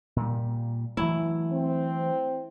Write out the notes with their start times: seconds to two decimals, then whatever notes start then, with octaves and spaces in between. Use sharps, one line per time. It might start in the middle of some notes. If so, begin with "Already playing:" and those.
0.16 A#2 G3
0.97 E3 F#3 A3 E4
1.53 C4